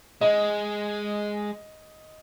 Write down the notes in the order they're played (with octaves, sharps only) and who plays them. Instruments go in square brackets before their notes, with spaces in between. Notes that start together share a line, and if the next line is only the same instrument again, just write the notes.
[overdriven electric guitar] G#3 [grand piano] D#5